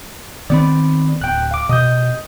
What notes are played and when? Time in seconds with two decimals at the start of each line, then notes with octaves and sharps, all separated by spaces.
0.50 D#3 B3 C4 D5 B5
1.21 D1 G5 F#6
1.51 F5 D6
1.69 B2 D#5 D#6 G6